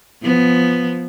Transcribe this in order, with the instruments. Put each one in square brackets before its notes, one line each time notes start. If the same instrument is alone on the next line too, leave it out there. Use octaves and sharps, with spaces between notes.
[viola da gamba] F3 B3